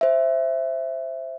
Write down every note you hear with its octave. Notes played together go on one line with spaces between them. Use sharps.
C5 E5